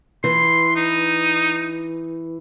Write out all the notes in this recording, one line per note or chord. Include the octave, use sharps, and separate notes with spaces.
E3 C6
D#4